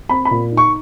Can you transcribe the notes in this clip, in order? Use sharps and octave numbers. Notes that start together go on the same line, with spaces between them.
C4 B5
B5
A#2
D#4
C#6